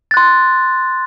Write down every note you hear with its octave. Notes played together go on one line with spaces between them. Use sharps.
C6 F#6 A6